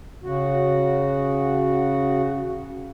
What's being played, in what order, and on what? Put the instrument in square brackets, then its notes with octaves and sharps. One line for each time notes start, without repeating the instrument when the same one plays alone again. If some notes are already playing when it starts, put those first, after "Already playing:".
[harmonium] C#3 F#4